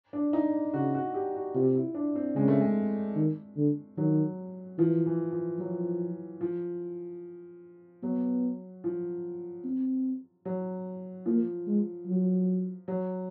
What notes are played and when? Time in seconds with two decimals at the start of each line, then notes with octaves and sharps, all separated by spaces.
0.13 D4
0.33 D#4
0.73 C#3 F#4
0.95 F#4
1.14 G4
1.35 F#4
1.55 C3 F4
1.75 E4
1.95 D4
2.15 C4
2.35 C#3 G#3
2.48 A3
2.61 G#3
3.16 D#3
3.56 D3
3.97 D#3 F#3
4.78 E3 F3
5.06 E3
5.32 F3
5.59 F3 F#3
6.41 F3
8.03 F#3 B3
8.84 F3
9.64 C4
10.45 F#3
11.26 F3 A#3
11.67 G#3
12.07 F#3
12.88 F#3